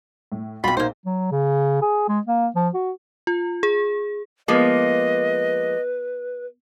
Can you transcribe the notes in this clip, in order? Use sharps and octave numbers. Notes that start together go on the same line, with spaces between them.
A2
B1 C4 F4 F#4 B5
A#1 A#3 D#4 C5
F#3
C#3
G#4
G#3
A#3
F3
F#4
F4
G#4
F3 G#3 A#3 B3 B4 D#5 D6